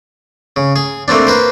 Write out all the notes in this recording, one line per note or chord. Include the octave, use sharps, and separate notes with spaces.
C#3
G#4
A3 A#3 C4 D4
A#3 B4 C5